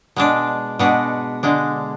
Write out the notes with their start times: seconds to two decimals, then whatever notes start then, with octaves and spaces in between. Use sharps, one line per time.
0.16 B2 G#3 D4
0.79 B2 G#3 D4 F#4
1.43 D3 G#3 D4